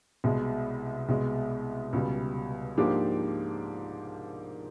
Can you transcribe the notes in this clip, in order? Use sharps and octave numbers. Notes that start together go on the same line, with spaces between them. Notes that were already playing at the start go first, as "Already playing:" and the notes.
C2 B2 G#3
C2 B2 G#3
C#2 B2 G3
G#2 F3 A#3 D4 G4